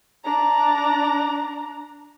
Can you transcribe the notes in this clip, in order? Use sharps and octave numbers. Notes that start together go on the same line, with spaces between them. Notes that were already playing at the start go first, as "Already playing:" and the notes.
D4 A#5